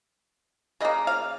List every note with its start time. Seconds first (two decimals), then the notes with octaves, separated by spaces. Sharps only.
0.81 C#3 D#5
0.85 A#3
1.07 F5